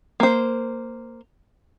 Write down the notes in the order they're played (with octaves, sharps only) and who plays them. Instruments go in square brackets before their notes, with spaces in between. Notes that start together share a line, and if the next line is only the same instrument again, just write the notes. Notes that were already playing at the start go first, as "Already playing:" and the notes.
[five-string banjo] A#3 C5